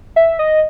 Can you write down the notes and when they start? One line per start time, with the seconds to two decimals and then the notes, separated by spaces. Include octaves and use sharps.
0.16 E5
0.39 D#5